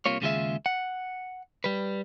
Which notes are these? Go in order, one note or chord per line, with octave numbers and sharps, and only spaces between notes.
C2 C3 A#3 F4 C#5
D#2 C#3 G#3 F4 G#4 E5
F#5
G3 B4